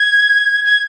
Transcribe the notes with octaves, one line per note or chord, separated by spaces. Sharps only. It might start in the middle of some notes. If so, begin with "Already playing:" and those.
Already playing: G#6
G#6